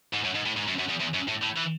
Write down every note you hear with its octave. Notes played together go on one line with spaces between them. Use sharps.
G#2
F#2
G#2
A2
G#2
F#2
F#2
E2
E2
F#2
A2
A2
E3